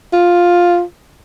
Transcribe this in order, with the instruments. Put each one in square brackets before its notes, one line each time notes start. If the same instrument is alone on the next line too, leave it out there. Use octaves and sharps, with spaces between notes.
[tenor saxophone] F4